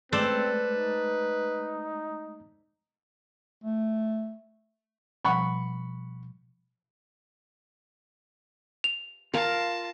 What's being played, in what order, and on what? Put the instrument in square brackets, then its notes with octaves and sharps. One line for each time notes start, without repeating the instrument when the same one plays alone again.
[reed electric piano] G#3 A3 G6 [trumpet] C4 [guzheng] A4 C5 D5 [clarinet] B4
[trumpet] D#4
[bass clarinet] A3
[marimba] B2 F3 G3 [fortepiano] F#5 B5 C#6
[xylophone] F7
[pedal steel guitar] F4 [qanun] A#4 F5 [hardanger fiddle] A5